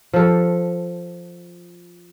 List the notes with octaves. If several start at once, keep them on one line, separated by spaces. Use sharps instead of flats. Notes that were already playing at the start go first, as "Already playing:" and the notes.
F3 A4